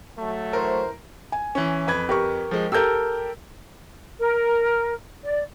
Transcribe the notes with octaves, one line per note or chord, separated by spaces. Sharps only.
F#3 A3
E3 A#4 C5
G#5
E3 C#4
F2 B4 G#6
G4 A#4 C#6
F3 G#3
G4 A4 A#4 E6 G6
A#4
D5